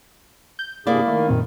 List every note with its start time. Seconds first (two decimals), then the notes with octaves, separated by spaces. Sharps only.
0.59 G6
0.87 G2 C3 A#3 E4 G#4 D5
1.08 D#3 A3
1.28 F#2 A#2 C4